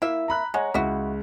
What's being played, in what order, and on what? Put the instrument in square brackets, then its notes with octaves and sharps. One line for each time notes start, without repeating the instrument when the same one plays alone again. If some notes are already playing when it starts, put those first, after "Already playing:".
[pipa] A#3 E5 [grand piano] E4
[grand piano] A#5 B5 F#6
[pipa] G#3 [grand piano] C#5 F#5 A#5
[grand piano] C#2 [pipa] E4 F#4